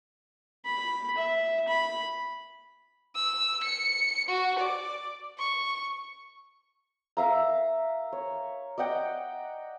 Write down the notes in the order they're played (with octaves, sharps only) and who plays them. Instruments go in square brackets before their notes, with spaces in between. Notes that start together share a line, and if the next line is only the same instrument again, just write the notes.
[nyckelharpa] B5
E5
B5
[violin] E6
C#7
F#4
D5
C#6
[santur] A#4 E5 F5 A#5
C#5
D5 D#5 F#5 G5